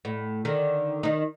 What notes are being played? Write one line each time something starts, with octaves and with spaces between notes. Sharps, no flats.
A2
D3 D#3
D#3 D#4